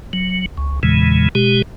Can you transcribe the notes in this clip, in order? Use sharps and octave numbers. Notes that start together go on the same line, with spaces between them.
F#3
C#2
E2 A#2 C#3 E3 G#3
B2 G#3 G4